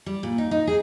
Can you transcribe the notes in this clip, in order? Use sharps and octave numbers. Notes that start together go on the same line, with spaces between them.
G3
A#2
D#4
D#4
G#4